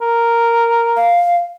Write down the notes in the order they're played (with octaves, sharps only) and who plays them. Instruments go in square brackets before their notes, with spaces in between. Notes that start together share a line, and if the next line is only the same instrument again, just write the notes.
[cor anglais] A#4
[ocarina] F5